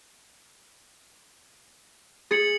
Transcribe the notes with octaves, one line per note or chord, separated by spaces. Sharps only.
G#4 A6 C#7 F#7